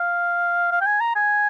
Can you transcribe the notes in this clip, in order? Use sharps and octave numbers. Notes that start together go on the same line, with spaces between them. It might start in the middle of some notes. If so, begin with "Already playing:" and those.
Already playing: F5
F5
G5
G#5
A#5
G#5